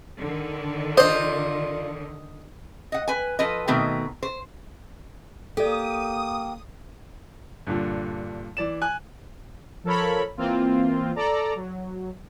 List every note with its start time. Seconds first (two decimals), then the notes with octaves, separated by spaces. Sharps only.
0.19 D3 D#3
0.97 F4 C5 D5 D#5
2.92 D#5 F#5
3.08 B4 G#5
3.39 F3 A4 B4 D#5
3.68 B2 D#3 A3 B3 C4
4.23 C5
5.57 A#3 G4 A4 D5 D#6
7.67 G2 A#2 D3
8.57 E3 D5 E7
8.82 G#5 F#6
9.84 F3 A4 A#4 C#5 B5
10.37 E3 A#3 C4 F4
11.16 A4 D5 A#5
11.55 F#3